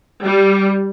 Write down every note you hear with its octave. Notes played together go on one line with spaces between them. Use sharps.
G3